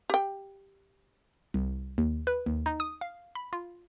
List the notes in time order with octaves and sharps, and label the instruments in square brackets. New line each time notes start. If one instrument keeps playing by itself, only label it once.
[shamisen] G4 G5
[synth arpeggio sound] C2
D#2
B4
D#2
D#4
D#6
F5
B5
F4